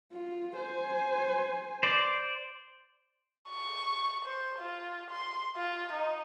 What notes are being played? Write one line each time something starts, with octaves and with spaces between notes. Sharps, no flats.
F4
C5 G#5
C5 D5
C#6
C5
F4
C6
F4
D#4